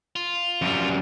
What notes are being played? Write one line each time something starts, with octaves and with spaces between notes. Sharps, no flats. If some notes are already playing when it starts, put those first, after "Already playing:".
F4
F#2 G3